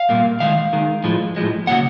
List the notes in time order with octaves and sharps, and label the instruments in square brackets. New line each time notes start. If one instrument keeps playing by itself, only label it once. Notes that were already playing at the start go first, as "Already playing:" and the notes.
Already playing: [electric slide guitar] F5
A#2 G3 A#3
D#3 G#3 F5
D#3 G#3
A2 F3 G#3
A2 F3 G#3
C#3 F#3 A#3 F#5